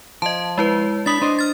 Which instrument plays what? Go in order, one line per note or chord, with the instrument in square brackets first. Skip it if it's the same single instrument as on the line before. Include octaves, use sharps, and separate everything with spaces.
[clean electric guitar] F3 [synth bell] D#5 A5
[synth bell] G#3 E4 B4
[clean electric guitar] D4 B5 [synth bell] D#6 A6
[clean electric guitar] D4 C5 D#5
[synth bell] F6 A6